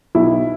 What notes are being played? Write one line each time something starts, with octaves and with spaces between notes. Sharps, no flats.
B1 E4